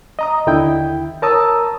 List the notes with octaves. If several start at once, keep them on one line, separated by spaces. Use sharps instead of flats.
D#5 A#5 D#6
D#2 D3 E4 G5 G6
A#4 C#5 A5 A#5 D#6 E6